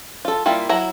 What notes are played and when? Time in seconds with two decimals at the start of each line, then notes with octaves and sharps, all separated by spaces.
0.25 F4 A4
0.46 G3 A#3 E4 F4
0.69 F#3 E4 A#5